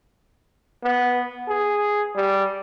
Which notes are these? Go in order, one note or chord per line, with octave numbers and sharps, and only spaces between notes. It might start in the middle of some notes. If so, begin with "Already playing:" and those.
B3
G#4
G3